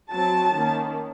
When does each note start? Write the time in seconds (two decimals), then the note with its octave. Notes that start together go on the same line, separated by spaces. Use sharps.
0.10 F#3 C4 A5
0.52 D#3 A#3 C#4